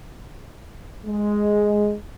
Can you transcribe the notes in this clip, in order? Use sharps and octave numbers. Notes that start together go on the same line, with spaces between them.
G#3